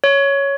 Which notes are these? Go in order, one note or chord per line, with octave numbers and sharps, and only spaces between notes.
C#5